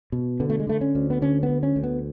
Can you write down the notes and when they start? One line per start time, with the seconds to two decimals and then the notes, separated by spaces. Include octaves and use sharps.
0.12 B2
0.40 D3 B3
0.50 A3
0.60 G#3
0.67 D3 A3
0.81 C#4
0.95 D2
1.10 B3
1.22 D3 C#4
1.43 B3
1.49 D2
1.63 C#4
1.76 D2
1.83 B3